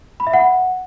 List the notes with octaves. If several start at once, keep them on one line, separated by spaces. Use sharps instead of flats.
B5
E5
F#5